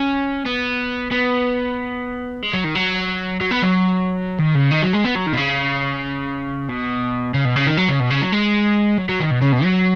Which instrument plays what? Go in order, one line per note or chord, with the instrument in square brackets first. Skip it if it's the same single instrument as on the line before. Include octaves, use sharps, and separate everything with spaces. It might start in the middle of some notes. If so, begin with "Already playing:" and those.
Already playing: [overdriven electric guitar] C#4
B3
B3
G#3
F#3
D#3
F#3
F#3
B3
F#3
D#3
C#3
D#3
F#3
G#3
B3
F#3
D#3
B2
C#3
B2
C#3
B2
C#3
D#3
F#3
C#3
B2
C#3
F#3
G#3
F#3
F#3
D#3
B2
C#3
B2
F#3